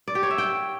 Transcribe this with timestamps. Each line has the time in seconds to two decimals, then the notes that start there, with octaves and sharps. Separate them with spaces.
0.08 D5
0.15 G4
0.23 C#5
0.31 E5
0.38 G5